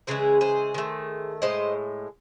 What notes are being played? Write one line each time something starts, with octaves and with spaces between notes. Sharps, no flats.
C#3 E3 G#3 G#4 C5
G#4 C5
D#3 A3
A2 G#3 C5 D#5